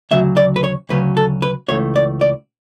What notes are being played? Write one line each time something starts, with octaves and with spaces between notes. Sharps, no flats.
D2 C#3 F#3 E5
D5
B4
C#5
D2 C#3 F#3 C#4 B4
A4
B4
C#2 C#3 E3 A3 C#5
D5
D5